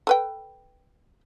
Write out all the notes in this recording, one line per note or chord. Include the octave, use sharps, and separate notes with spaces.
A4 B4 G5